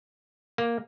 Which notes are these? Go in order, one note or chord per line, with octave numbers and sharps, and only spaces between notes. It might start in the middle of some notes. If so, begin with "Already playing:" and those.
A#3